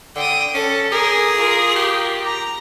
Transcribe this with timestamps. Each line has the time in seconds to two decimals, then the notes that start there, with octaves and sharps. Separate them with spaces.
0.16 D3 G5 D#6
0.54 C#4 A4
0.92 G#4 A#4 G#5
1.35 F4 A#4
1.76 G4
2.25 A#5